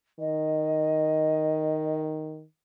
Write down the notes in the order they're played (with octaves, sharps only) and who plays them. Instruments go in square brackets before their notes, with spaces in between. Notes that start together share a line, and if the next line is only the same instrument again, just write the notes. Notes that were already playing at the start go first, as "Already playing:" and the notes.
[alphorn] D#3 [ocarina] D#5